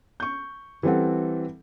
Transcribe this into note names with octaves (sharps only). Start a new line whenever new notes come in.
C#6 G6
E3 G3 C4 A4 F#5